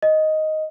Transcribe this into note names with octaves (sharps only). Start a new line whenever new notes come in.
D#5